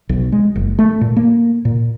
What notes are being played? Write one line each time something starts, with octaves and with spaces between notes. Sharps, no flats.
B1
G#3
F#1
A3
A#2
A#3
A#2